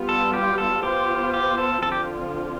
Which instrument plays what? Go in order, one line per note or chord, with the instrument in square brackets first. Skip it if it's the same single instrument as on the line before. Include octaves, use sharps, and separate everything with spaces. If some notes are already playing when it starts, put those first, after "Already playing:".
Already playing: [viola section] G3 B3 F4
[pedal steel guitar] A4
G4
A4
[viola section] B3 F4 C5 [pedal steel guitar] G4
[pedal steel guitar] G4
A4
[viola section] D3 F3 C4 F4 [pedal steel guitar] A4
[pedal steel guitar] G4